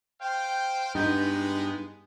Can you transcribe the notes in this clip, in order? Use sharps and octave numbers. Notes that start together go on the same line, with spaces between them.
C5 F5 G5
G2 G#3 B3 D#4 G6